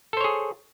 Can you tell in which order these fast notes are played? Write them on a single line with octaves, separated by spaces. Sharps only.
A4 C5 C#5 G#4